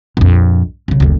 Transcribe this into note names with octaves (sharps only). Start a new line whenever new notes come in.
A#1 F2
B1 C#3
F#1 D2